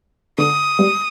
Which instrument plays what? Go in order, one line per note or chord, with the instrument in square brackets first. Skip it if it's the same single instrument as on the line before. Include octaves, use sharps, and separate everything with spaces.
[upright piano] D3 [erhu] D#6
[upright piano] G3